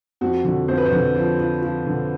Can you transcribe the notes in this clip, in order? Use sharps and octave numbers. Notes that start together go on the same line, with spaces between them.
F2 F#4
D3
F2 C5
B4
C5
D3
F3
F3
F3
D3